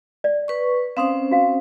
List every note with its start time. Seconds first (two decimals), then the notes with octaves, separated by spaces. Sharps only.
0.24 D5
0.48 B4 C#6
0.97 C4 C#4 C5 F5 C6 D#6
1.31 F#4 F5